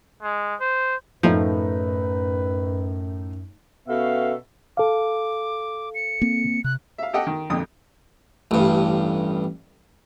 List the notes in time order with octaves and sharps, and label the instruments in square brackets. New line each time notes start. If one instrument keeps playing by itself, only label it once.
[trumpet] G#3
C5
[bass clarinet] F#2 [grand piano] A2 A3 D#4 [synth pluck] F3 [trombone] B4
[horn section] B2 B3 C#4 A4 E5 F5
[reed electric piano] A4 F5 [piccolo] D6
[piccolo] C#7
[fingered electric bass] A#3 C4
[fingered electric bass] C3 [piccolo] F#6
[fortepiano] E5 F5
G4 A4 D#5 F#5 G5
D#3
G#1 F2 A#2 D3 D#6
[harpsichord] A1 G2